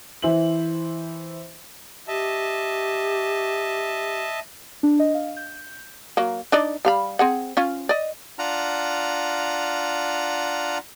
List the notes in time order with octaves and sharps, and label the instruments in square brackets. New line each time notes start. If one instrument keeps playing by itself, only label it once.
[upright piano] E3 E4 C5 E5 F#7
[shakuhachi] G4 [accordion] D#5 E5 A5
[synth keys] D4
D#5
F5
G6
[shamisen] F#3 A#3
D4 D#4 D5
G3 F5 B5
C4 G#4 F#5
C#4 F4
D5 D#5
[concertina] D4 F4 F#5 A#5 F6